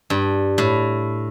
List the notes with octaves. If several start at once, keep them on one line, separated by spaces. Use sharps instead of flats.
G2
A2